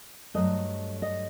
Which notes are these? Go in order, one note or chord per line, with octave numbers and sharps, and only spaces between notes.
G2 F#3 A3 D#5
D#5